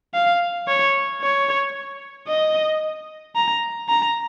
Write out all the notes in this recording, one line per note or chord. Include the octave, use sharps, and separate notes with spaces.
F5
C#5
C#5
D#5
A#5
A#5